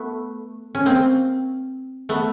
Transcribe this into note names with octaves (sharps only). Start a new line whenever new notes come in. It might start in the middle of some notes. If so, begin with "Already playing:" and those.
Already playing: A3 B3
C#4
A#3 C4
A3 B3